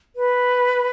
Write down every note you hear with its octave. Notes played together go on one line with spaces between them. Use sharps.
B4